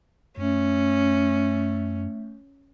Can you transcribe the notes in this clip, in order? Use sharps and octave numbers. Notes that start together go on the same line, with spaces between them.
F#2 A3 C#4